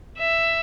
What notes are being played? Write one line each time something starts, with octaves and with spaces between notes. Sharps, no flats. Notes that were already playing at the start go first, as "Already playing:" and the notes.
E5